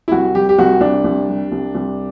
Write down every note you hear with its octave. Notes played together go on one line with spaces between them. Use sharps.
E4
C2 F#4
G3 G4
G4
C2 F#4
C2 D4
C2
G3
C2
C2